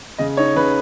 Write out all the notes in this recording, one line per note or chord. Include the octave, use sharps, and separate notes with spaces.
C#3 D#5
D#4 C#5
C#3 B4